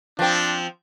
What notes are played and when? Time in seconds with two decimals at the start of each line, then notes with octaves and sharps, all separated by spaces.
0.19 F3 C4 D4